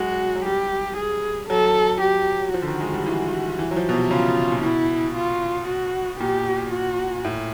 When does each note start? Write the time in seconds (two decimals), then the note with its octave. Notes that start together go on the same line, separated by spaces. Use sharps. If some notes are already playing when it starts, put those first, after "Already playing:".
Already playing: F#3 G#3 F#4
0.36 F#3
0.45 G3 G4
0.97 G#4
1.49 F#3 A4
2.02 G4
2.54 F3 F#4
2.62 D3
2.67 D#3
2.80 G#3
2.93 G3
3.06 E3
3.59 E3
3.71 F#3
3.76 F3
3.89 B2
3.93 C3
4.11 C#3 F4
4.52 A#2
4.63 B2 E4
5.15 F4
5.68 F#4
6.20 A#2 G4
6.72 F#4
7.25 A2